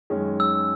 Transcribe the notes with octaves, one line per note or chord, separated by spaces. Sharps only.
F#2 D#3 G#3 C#4
E6